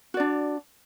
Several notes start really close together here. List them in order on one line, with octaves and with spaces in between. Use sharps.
F#4 D5 D4